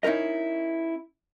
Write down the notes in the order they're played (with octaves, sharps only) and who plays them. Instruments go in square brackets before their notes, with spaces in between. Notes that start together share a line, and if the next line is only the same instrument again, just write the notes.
[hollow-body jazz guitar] C#4 D#4 E4 A#4 D#5